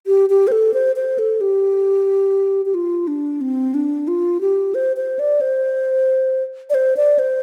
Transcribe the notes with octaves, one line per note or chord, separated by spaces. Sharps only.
G4
G4
C5
A4
C5
C5
A4
G4
G4
F4
D4
C4
D4
F4
G4
C5
C5
D5
C5
D5
C5
D5
C5